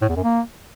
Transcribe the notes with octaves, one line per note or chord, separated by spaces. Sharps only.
A2
E2
F#2
A#3